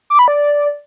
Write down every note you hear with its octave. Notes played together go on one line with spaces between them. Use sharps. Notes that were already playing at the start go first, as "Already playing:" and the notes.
D6
B5
D5